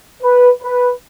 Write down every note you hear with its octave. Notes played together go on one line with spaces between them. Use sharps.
B4
B4